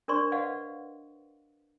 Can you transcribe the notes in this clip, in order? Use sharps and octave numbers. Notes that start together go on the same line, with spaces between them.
D4 A#4 C5 D5 C6 C#6
B4 D5 D#5 F5 F#5